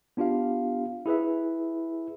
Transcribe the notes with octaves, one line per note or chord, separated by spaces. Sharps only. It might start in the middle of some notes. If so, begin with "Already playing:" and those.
B3 D4 F4 G4 F5
E4 G#4 B4 E5